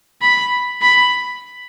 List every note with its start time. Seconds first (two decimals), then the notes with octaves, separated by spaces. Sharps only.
0.22 B5
0.82 B5